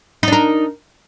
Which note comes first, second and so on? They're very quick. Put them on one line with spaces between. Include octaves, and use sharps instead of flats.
D#4 D4 A#4